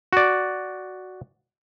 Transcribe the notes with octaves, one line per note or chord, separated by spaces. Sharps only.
F#4 D5